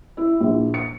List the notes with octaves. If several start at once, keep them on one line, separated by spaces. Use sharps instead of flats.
E4
A#1
C#7